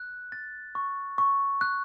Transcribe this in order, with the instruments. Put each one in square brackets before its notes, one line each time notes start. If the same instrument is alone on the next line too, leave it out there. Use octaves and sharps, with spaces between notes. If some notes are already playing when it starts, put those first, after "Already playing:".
Already playing: [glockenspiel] F#6
A6
C#6
C#6
F#6